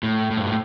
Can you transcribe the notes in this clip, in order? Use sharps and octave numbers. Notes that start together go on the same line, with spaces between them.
A2
A2
G2
A2